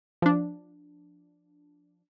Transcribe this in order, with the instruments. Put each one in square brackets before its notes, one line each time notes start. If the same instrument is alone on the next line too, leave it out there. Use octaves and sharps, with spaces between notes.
[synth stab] F3 D4